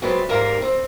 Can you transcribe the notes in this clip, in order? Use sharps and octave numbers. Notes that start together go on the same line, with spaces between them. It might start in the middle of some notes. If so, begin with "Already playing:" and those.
F#3 G#3 A3 C4 B4 D5
G#2 G3 A#4 F5 A#5
C4